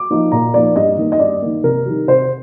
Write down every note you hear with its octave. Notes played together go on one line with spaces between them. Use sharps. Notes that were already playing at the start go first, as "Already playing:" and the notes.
Already playing: D6
F3 A#3 D#4
A#2 A#5
F3 A#3 D#4 D5
G2 D#5
D#3 A#3
D#5
G2 D5
D#3 A#3
C3 A#4
D#3 G3
C3 C5